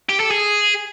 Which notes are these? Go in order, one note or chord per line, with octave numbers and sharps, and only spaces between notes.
G4
A4
G#4